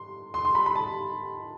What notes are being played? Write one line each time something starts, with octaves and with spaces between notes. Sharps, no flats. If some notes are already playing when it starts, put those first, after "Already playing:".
Already playing: C6
C6
C6
B5
B5
A5